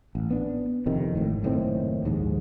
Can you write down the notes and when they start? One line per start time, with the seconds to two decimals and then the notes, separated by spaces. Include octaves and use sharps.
0.15 A1
0.30 B3 D4
0.86 F2 C3 D#3
1.15 G#1 A2
1.43 F#1 A2 D#3 C4
2.04 A#1 D#2 G#2